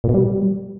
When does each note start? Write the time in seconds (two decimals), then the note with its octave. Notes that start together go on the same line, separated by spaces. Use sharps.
0.04 A#2
0.09 B2
0.14 G3